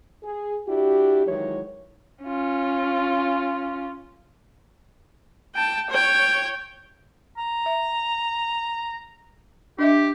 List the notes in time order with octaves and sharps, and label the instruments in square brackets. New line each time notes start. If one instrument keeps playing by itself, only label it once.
[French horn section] G#4
D4 E4 F#4 G4
D#3 E3 F#3 G#3 C#5
[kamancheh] C#4 F4
[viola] G5 A5
C#5 G5
[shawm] A#5
[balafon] E5
[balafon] D4 D#5 E5 [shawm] G4